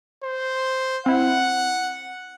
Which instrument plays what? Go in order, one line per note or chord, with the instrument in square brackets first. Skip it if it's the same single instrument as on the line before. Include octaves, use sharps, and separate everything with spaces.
[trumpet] C5
[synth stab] C4 E4 [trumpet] F#5